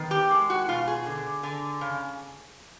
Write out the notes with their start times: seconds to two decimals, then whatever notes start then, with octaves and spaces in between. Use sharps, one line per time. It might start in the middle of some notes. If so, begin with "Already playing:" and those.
Already playing: D#3 B3
0.11 G4
0.31 G#3
0.50 F#4
0.69 B2 F4
0.88 G#4
1.06 D3
1.43 D3
1.81 C#3